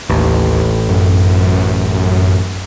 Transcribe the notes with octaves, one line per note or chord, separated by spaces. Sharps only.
A1 D#2
F#2